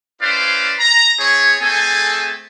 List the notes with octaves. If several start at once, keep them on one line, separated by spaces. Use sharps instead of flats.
C#4 E4 B4 C5 D5 F5
A#5
C4 E4 G#4 C#5
A3 C4 G#4 A4 G#5